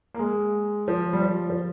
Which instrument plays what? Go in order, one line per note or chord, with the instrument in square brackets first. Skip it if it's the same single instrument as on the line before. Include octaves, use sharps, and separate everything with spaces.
[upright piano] A#3
G#3
F3
G3
F3
F3